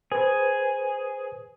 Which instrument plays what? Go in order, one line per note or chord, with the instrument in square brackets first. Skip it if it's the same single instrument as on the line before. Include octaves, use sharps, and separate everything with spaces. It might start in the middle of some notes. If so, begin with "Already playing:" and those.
[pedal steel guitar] G#4 [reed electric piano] B4 C5